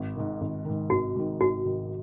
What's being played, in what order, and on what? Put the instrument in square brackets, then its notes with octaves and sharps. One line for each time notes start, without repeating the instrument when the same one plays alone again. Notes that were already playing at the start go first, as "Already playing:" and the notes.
Already playing: [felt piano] G#1
G#2 D#3
G#1
G#2 D#3
[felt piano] G#1 [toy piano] F#4
[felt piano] G#2 D#3
[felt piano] G#1 [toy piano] F#4
[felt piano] G#2 D#3